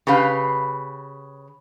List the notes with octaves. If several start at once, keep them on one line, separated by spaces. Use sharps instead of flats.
C#3 G4 B4 F5